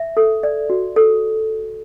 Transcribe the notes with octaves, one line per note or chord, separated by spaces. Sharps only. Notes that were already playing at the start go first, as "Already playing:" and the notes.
Already playing: E5
A4
D5
F#4
A4